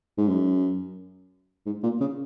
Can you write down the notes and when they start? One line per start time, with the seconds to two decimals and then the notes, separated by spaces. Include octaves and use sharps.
0.18 G#2
0.28 F#2
1.66 G#2
1.83 A#2
2.00 C#3